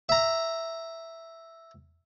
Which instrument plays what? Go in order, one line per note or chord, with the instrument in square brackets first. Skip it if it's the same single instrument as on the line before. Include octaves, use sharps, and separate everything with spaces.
[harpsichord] E5 A#5